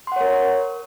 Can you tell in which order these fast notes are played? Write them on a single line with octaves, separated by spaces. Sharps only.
C6 F#5 C#5 A#4